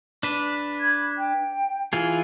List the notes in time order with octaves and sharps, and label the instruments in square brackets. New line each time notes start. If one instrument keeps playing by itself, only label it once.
[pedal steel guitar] D4 B4
[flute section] B5 G#6
G5
[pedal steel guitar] E3 F4 G#4 [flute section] G#5